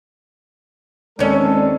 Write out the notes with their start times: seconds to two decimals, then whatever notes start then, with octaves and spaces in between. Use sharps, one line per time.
1.19 D#2 G#3 C4 C#4 A4 D5